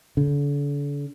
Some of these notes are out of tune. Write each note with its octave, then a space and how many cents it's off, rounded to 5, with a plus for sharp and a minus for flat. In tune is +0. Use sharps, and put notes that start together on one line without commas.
D3 -40